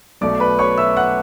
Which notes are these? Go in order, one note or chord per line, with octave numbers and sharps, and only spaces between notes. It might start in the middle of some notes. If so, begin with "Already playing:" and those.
B1 B2 A3 D5 D6
B4 B5
C#5 C#6
E5 E6
F#5 F#6